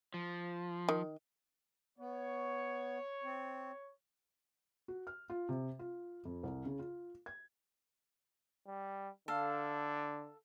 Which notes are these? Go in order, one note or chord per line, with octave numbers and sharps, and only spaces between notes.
F3
D#3
B3 C#5
C4
F#4
F6
F4
C3
F4
F2
C2
C#3
F4
G#6
G3
D3 A4 F5